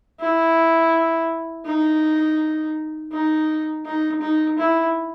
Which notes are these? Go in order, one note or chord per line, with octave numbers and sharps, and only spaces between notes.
E4
D#4
D#4
D#4
D#4
E4